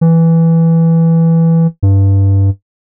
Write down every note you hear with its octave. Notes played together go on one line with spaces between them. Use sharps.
E3
G2